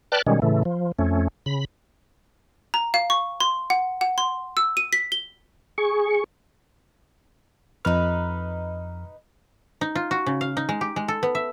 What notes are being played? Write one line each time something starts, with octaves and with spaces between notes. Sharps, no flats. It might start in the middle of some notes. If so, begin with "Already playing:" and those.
B4 D5 G5 A5 F6 F#6
B2 D#3 G3 G#3 C#4
A2 C#3 E3 A3
F3
F2 A3 C#4
C#3 B5
A#5
F5
C#6
C6
F#5
F#5
C6
E6
D#7
B6
G7
G#4 C#6
F2 D#4 B4 F6
D#4
F4
F#4
C#3
F5
D#4
G#3
G4
G#3
A4
B3
E5